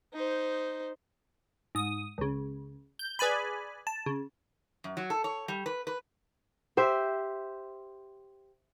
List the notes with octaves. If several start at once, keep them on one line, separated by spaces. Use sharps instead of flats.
D#4 C5
G#2 D#6
C#2 C#3
G6
G#4 B4 D5 G#5 B5
A5
C#3
F#2
F#3
A4
C#5
G3
B4
B4
G4 C5 E5